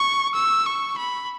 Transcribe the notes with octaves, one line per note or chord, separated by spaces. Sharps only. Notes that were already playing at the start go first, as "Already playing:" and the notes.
Already playing: C#6
E6
C#6
B5